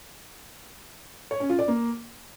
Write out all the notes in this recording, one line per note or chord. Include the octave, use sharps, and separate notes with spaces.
C#5
C#4
F4
D5
A#3